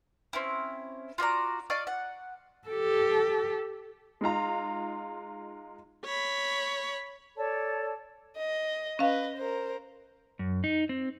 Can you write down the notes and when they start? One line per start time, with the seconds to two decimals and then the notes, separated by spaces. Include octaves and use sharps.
0.33 C4 C#4 E4
1.18 F4 F#4 D5 A#5
1.70 D5 D#5 F5 C#6
1.87 F#5
2.68 G4 A4
4.21 G#3 D#4 F4 A#5
6.04 C#5 B5
7.36 A4 C#5 D5 A5
8.37 D#5
8.99 C#4 B4 D#5 F5
9.37 A#4 C5
10.39 F#2
10.64 D#4
10.89 C4